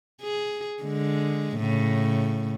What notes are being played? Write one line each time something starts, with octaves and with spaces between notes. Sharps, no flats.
G#4
D3 G#3
A2 C#3